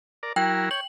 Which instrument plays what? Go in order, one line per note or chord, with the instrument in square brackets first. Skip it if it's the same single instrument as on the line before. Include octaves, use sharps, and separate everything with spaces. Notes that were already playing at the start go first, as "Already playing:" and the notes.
[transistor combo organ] A#4 D5
[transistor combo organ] F#3 E4 A#4 [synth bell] G5
[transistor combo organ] C#5 G5 [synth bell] F#7